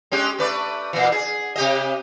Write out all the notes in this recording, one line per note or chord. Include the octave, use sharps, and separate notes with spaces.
G#3 C#4 G4
A3 B4 D5
A#2 E3
G#4
C3 G4 D#5